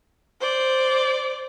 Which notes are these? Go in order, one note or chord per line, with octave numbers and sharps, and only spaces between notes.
C5 D5